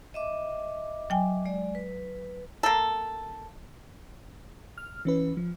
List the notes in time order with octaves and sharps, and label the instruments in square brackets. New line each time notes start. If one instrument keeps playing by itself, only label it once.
[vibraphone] D#5 E5 D6
[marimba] F#3 G5 G#5
[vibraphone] G#3 D5
B4
[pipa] A#3 A4
[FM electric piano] F6
E3 C#4 B4
F3